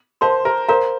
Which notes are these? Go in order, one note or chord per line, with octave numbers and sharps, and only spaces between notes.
A#4 C5 F5 A5 C6
A#4
A#4 C5 F5 A#5